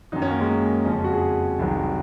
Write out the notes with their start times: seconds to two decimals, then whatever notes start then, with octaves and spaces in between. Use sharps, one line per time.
0.12 F#2 D#3 F#3 D#4
0.22 C#4
0.30 A#3
0.41 G#3
0.49 A#3
0.85 F2 C#3 F3 C#4
1.04 F#4
1.14 G#4
1.59 C2 C3 D#3 F#3